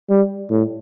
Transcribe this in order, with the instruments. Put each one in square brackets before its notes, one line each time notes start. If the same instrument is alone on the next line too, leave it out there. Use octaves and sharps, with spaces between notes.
[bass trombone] G3
A2